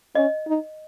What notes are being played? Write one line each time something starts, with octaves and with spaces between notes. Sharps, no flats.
C#4 D#5
D#4